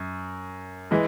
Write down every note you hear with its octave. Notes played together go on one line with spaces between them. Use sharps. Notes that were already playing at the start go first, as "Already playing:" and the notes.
Already playing: F#2
E3 G#3